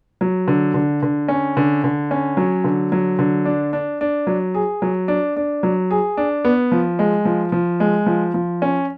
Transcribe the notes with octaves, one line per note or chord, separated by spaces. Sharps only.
F#3
D3
D3
D3
C#4
D3
D3
C#4
F#3
D3
F#3
D3
D4
D4
D4
F#3
G#4
F#3
D4
D4
F#3
G#4
D4
B3
F3
G#3
F3
F3
G#3
F3
F3
C#4